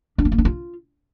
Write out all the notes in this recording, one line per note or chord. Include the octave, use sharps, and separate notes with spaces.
D4
B3
A#3
D4
F4